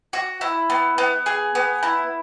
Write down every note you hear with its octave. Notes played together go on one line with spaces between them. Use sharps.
F#4
E4
B3
B3
G#4
B3
E4